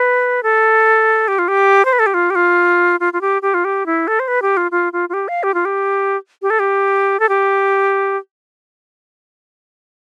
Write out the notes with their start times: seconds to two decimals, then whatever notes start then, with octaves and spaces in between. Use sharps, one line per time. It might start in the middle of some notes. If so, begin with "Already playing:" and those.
Already playing: B4
0.43 A4
1.28 G4
1.39 F4
1.48 G4
1.85 C5
1.93 B4
1.99 A4
2.06 G4
2.14 F4
2.30 G4
2.35 F4
3.00 F4
3.13 F4
3.21 G4
3.42 G4
3.54 F4
3.65 G4
3.86 E4
4.08 A4
4.20 C5
4.28 B4
4.42 G4
4.57 F4
4.71 F4
4.93 F4
5.09 F4
5.13 G4
5.28 F5
5.43 G4
5.54 F4
5.65 G4
6.42 G4
6.50 A4
6.59 G4
7.20 A4
7.29 G4